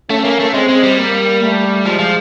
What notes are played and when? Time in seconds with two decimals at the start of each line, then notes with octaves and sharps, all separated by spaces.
0.10 A3 C#4
0.25 A#3
0.40 A3
0.54 G#3 C4
0.69 G#3
0.84 G3
0.98 A#3
1.41 A3
1.86 F3 G#3
1.99 F3